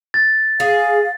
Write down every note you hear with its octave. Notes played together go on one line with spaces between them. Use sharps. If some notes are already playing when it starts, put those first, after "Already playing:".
A6
G#4 F5